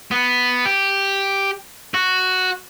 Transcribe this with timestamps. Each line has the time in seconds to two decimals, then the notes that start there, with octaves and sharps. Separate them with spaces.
0.11 B3
0.66 G4
1.94 F#4